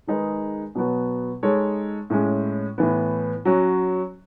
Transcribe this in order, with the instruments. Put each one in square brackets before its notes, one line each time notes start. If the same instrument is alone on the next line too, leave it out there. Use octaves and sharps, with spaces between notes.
[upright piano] D#3 G#3 D#4 G#4 B4
B2 F#3 B3 F#4
G#3 D#4 A4 C#5
A2 G#3 C#4
A2 E3 B3
F#3 C#4 F#4